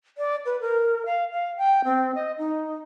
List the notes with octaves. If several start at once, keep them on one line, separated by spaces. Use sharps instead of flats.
D5
B4
A#4
F5
F5
G5
C4
D#5
D#4